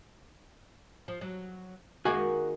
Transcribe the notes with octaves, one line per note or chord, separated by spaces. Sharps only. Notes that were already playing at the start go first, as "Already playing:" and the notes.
F3
F#3
D#3 G#3 A#3 F#4 G#5